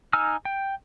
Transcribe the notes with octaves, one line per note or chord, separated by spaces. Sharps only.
D#4 G#5 E6 F6
G5